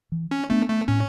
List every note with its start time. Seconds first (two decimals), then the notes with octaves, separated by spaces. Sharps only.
0.12 E3
0.31 C#4
0.50 A3 B3 D4
0.69 A3
0.88 A2 C#4